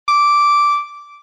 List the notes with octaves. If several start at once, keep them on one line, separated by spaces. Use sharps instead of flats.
D6